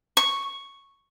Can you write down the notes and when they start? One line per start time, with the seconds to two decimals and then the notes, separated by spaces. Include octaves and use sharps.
0.17 C#6